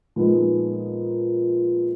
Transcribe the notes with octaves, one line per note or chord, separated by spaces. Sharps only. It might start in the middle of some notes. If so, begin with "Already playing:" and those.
A#2 F3 G#3 B3 D#4